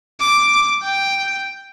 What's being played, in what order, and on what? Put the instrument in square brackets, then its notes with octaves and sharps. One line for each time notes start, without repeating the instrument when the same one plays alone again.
[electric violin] D6
G5